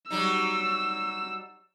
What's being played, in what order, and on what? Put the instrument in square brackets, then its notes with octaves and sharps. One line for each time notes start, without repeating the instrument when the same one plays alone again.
[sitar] F#3 G3 D#4 [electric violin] E6